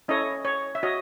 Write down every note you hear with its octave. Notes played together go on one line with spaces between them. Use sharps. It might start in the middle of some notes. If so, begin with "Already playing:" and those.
C#4 E4 A4 C#5 D#5
C#5
E5
F#4 C#5 D#5